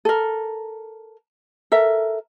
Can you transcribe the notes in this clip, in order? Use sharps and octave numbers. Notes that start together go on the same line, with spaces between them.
A4 A#4
A4 A#4 E5